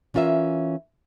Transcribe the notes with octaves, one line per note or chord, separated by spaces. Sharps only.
E3 C#4 F4 A#4 E5